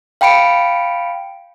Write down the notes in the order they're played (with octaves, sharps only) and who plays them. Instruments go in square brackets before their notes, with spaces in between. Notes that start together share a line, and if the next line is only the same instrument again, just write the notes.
[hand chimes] F5 G5 A5 B5 C#7 D7